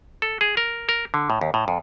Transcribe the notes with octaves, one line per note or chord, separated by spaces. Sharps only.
A4
G#4
A#4
A#4
D3
A2
D#2
A2
F2